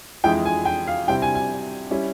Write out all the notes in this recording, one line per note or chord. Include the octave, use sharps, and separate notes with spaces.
F2 E3 G#3 E4 G5
G#5
G5
F5
C3 G3 C4 E4 G5
G#5
G#5
G3 C#4 E4